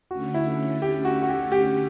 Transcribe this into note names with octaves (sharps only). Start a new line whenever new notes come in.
D3 A3 C#4 F#4
E4
G4
F#4
F#4
G4
G4